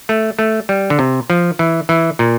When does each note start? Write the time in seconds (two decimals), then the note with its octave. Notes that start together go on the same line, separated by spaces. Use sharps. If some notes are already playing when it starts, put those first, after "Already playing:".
0.09 A3
0.39 A3
0.69 G3
0.90 D3
0.99 C3
1.30 F3
1.59 E3
1.89 E3
2.19 A#2